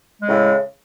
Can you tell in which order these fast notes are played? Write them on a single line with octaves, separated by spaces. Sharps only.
G#3 C#3 A2